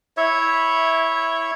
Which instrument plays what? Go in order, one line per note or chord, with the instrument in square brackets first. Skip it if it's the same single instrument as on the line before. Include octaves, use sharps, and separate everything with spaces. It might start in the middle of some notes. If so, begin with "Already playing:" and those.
[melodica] E4 C#5 E5